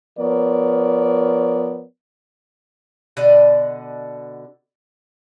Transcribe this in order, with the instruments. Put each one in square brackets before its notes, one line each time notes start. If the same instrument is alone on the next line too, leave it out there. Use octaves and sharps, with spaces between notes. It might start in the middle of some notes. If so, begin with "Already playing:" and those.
[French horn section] F3 B3 A#4 C#5 D5
[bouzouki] B2 D3 D5 D#5